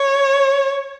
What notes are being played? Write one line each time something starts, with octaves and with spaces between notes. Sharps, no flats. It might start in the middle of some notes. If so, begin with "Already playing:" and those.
Already playing: C#5